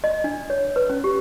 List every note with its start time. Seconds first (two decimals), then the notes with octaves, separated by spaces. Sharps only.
0.04 D#5
0.24 D4
0.50 C#5
0.76 B4
0.90 C#4
1.04 G4